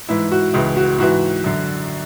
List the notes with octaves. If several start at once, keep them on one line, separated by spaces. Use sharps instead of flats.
G#2 E3 E4
F#4
C#2 C#3 E3
F#4
G#2 E3 F#4
F#2 D3